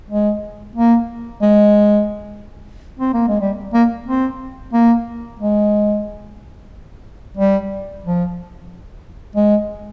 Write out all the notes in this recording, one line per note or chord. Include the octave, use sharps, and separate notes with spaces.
G#3
A#3
G#3
C4
A#3
G#3
G3
A#3
C4
A#3
G#3
G3
F3
G#3